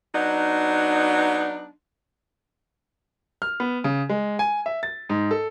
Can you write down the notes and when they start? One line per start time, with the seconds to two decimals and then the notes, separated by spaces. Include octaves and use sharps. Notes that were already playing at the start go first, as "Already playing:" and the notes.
0.15 F#3 B3 D4 D#4
3.42 F6
3.60 B3
3.84 C#3
4.09 G#3
4.39 G#5
4.66 E5
4.83 A6
5.09 G#2
5.31 A4